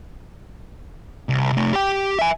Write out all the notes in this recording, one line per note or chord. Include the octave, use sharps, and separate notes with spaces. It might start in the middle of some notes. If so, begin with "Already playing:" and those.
C2
C3 A3
G4 G5
E5 G#5